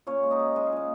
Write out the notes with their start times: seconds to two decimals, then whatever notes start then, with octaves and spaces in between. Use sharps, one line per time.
0.07 A#2 C#4 C#5
0.23 G#3
0.31 D#4 D#5
0.39 G#3
0.56 G#3 G#5
0.67 F5
0.72 A#2 D#5